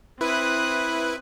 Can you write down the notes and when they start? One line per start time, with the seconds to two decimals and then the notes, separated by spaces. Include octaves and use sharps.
0.21 C4 E4 B4 D#6 F#6